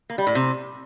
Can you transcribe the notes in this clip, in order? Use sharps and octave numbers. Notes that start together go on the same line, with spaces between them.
A#3
G3
A2
C3